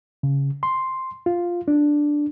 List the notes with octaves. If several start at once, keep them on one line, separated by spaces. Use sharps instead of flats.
C#3
C6
F4
D4